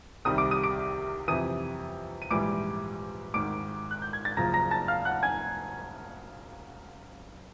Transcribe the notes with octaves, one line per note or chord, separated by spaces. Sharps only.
C2 C3 D#3 G3 D#6 D#7
D6 D7
D#6 D#7
D6 D7
F2 C3 E3 D#6 D#7
D#7
A#1 G#2 E3 G3 D6 D7
G#1 G#2 D#3 D6 D7
F#6
G6
G#6
A6
F#1 F#2 C#3 F3 A#5 A#6
A#5 A#6
A5 A6
F5 F6
F#5 F#6
G#5 G#6